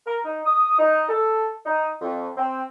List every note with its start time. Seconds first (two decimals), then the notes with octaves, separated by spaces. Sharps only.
0.07 A#4
0.25 D#4
0.46 D#6
0.79 D#4
1.09 A4
1.66 D#4
2.01 F2
2.37 C4